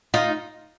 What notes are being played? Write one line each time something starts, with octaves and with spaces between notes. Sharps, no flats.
D#4 F4